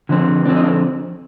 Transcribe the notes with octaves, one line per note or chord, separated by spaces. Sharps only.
D3 F3 C4
D3 F3 C4 D4
D#4
D4